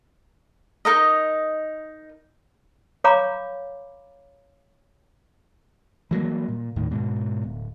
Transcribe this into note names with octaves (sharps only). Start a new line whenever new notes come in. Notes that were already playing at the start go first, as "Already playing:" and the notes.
D#4 A#4 D#5
C#5 F5 A#5 B5 C#6 D6
E3 F#3 G3 A#3
A#2
D#2 A2 D#3
G#2 B2
D1